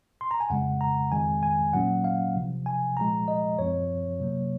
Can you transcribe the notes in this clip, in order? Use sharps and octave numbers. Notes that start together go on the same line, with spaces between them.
C6
A#5
G#5
F2 C#3 G#3 F#5
A#5
F2 D#3 G#3 G#5
G#5
A#2 F#3 A#3 C#4 F#5
F5
C2 C3 F3
G#5
C2 A#2 F3 G#3 A#5
D#5
F#2 F3 C4 C#5
C3 F#3 A#3